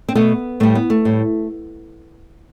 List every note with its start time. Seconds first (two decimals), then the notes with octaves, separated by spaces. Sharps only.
0.09 C4
0.15 B2 A3 B3
0.60 A2 G3 A3
0.75 B3
0.90 A3
1.05 A2 G3